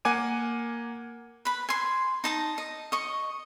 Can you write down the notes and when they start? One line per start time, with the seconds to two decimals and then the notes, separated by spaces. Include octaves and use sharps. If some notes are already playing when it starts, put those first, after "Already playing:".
0.05 A#3 F#5 G#5 D6 D#7
1.45 B4 B5
1.69 G#5 C6
2.24 D#4 A5 A#5
2.58 D#5
2.92 D#5 C#6